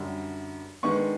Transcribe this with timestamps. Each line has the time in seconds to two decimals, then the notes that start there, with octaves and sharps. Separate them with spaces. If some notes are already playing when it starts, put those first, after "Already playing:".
Already playing: F#2 D3 G3
0.83 D#3 G#3 B3 D4 C#6